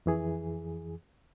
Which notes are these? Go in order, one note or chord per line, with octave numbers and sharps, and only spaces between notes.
F2 E3 G#4